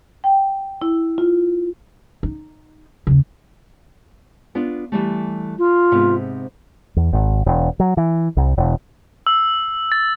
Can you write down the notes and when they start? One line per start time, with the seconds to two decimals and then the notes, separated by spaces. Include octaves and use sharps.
0.24 G5
0.82 E4
1.18 F4
2.23 D#4
3.07 D#2 C#3
4.55 B3 D4 F4
4.92 E3 G3 A3
5.59 F4
5.92 G#2 C3 B3
6.96 E2
7.13 G#1
7.46 E1
7.80 F#3
7.97 E3
8.37 C2
8.58 E1
9.27 E6
9.92 A6